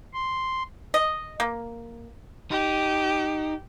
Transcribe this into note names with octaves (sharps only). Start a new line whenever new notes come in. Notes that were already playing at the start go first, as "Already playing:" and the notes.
C6
D#5
A#3
D#4 G4